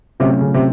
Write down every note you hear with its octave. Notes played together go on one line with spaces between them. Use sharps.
C3 F#3 A3 C#4 F4
C#3
C3